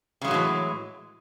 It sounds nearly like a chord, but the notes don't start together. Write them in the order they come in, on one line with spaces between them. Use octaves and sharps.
C#3 G#3 F#3 A2 E3